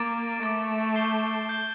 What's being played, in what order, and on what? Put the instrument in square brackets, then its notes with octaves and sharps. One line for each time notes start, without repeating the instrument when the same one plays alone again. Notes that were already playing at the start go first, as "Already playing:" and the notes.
Already playing: [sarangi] A#3 [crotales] D6 A6 D7
[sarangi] A3 [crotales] D6 A6 D7
[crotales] G6 C7 G7
G6 C7 G7